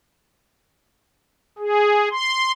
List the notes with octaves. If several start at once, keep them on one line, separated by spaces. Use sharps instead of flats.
G#4
C6